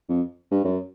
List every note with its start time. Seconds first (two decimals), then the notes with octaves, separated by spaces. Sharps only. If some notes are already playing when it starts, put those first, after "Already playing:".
0.09 F2
0.51 G2
0.64 F#2